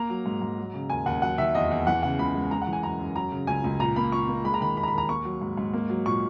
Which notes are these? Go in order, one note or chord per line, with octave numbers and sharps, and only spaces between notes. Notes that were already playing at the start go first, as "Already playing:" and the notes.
Already playing: A#3 A#5
F#3
G#2
G#2
F#3
C#3
D#2 G#5
D#2 F#5
F#3 F#5
D#3 E5
E2 D#5
E2
E3 F#5
C#3 F#5
C#2 B5
G#3
G#3 A#5
F#5
E3
G#5
F#2 A#5
F#2
F#3 A#5
C#3
C#2 G#5
C#2
A#2 A#5
A#3 B5
A#2 C#6
A#3
G#3 B5
A#5
D#3 B5
D#2 B5
A#5
B5
D#2
A#5
A#3 C#6
F#3
G#2
G#2
A#3
F#3
A#2 C#6